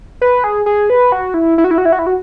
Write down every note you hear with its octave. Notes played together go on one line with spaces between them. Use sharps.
B4
G#4
G#4
B4
F#4
E4
E4
F#4
E4
F#4
E4
F#4
E4
F#4